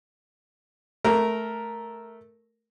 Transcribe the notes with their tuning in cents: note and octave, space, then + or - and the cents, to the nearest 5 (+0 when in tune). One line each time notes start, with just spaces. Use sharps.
A3 -10 A#4 +0